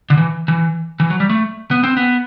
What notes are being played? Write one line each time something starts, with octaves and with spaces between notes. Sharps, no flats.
D3
E3
E3
E3
F#3
G3
A3
B3
C4
B3